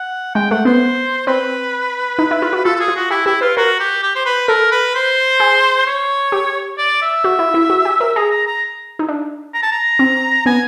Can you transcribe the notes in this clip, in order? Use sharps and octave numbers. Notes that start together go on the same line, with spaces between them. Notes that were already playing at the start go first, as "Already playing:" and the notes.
Already playing: F#5
G#3 G5
A3 F#5
B3 C5
C4 B4
D#4
E4
F4
F#4
F4 A4
A4
G#4
F4
F#4
E4 G4
E4 G4
F4 B4
F#4 A#4
G4
G4
C5
B4
A4 A#4
B4
C5
G#4
C#5
G4
D5
E5
F#4
E4
E4
F#4
G4
A#4
G#4 A#5
A#5
A#5
D#4
D4
A#5
A5
A#5
C4
B3 G#5